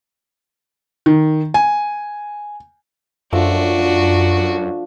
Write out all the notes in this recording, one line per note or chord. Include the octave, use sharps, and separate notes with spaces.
D#3
G#5
F#2 F3 A3 D4 F#4 E6